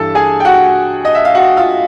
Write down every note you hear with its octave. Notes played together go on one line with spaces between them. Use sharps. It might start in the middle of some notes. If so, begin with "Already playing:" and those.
Already playing: G2 E3 A4 A5
G#4 G#5
G5
F#4 F#5
D#5
E5
F5
F#4 F#5
F4 F5